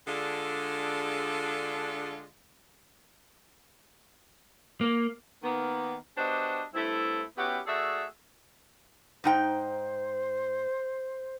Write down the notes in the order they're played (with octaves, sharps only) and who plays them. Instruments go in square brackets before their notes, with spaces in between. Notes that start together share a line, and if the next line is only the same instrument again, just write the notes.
[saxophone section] D3 G#3 D4 F4 G#4 A4
[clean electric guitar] A#3
[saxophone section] D#3 A#3 B3
B3 D4 F#4 G4 C5 D#5
G2 A3 C4 E4
B3 C#4 E4 F#4 G4
A3 F#4 G#4 A4 D5 E5
[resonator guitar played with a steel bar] G#2 D#4 G5 [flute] C5